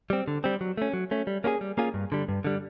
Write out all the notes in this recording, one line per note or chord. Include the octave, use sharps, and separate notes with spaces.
G3 C4
D3
G3 C4
F#3
A3 C#4
F#3
A3 C#4
G3
A#3 C#4 F4 G#4
G3
A#3 C#4 F4 G#4
G2
D3 G3
G2
D3 G3